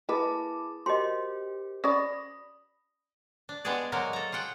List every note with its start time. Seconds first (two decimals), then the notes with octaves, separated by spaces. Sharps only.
0.09 A#3 E4 G#4 B4 A5 D6
0.86 F#4 G4 A#4 C5 D#5 C6
1.84 C#4 D5 B5 D#6 A#6
3.49 D4
3.65 G3 G#3 B3 D4 G#4 D5
3.92 F#3 G#3 A#3 F#4 A#4
4.13 A4 A#5
4.32 F4 G#4 F#5 G5